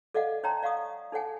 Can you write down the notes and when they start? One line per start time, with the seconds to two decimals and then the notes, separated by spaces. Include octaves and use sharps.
0.14 A4 D5 D#5 F5 F#5
0.43 D#4 C#5 D5 G5 A#5 C6
0.63 D5 F5 F#5 C#6 D#6
1.12 D#4 A4 C#5 F#5 G#5